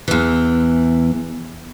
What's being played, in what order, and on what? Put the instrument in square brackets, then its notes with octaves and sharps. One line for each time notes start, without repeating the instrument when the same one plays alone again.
[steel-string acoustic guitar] E2 E3